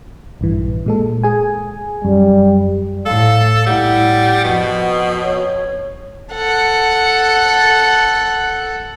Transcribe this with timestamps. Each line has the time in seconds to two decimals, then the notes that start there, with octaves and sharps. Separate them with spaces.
0.41 A#1 G2 E3
0.86 A#2 G#3 A4
1.24 G#4 G#5
2.04 F#2 G3
3.06 A2 A4 F5
3.66 A2 G3 E4 F#5
4.44 F2 B2
5.22 C#5
6.32 A4 F#5